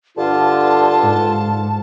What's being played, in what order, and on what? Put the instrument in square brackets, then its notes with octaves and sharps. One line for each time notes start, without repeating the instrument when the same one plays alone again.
[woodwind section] G2 D3 [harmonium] F4 [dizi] A5
[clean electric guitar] G#2